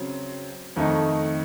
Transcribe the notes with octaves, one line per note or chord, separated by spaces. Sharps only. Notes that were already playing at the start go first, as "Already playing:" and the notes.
Already playing: C#3 F#3 C4
F2 D#3 A3 D#4